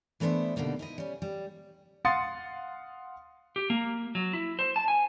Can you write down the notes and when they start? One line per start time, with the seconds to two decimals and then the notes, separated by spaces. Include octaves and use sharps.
0.20 E3 A3 B3 D4 C5 E5
0.56 B2 D3 G3 A#3 D#4
0.79 D#4 E4 D#5
0.98 G3 C#4
1.22 G3
2.05 F5 F#5 C6 D#6 A6 C#7
3.56 G4
3.70 A#3
4.15 F#3
4.33 E4
4.59 C5
4.76 A5
4.88 G#5